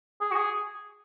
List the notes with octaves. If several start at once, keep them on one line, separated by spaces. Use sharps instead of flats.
G#4
F#4
G#4